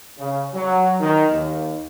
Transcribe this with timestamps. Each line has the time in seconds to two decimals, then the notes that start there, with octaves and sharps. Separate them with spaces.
0.19 C#3
0.54 F#3
1.00 D#3
1.31 D#2